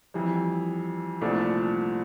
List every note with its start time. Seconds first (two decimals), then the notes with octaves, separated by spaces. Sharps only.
0.14 F2 E3 G3
1.21 C2 A#2 F3 A3 D4